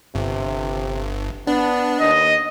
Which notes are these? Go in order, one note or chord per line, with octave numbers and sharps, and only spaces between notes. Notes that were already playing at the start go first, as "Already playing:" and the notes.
G1 C3
B3 D4
D#2 D#5